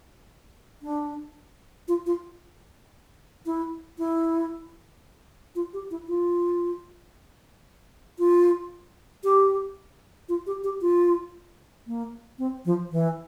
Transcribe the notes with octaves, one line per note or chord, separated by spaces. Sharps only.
D4
F4
F4
E4
E4
F4
G4
E4
F4
F4
G4
F4
G4
G4
F4
A#3
C4
F3
E3